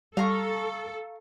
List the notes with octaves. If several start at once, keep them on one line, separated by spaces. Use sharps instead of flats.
G3 A4 F5 A#5 C#6